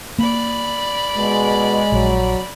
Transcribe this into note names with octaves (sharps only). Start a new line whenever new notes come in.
A#3 D5 B5
B2 G#3
A#1 F#3